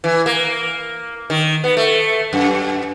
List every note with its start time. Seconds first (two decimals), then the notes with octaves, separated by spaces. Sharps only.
0.04 E3
0.26 A#3
1.30 D#3
1.64 B3
1.77 A3
2.33 F#2